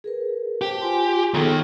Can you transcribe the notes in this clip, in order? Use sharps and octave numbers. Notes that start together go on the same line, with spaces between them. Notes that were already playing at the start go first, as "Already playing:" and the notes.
G#4 A#4 B4
G4 C5 A5
F4 G#5 C6
D#2 D#3 B3 G#4 A4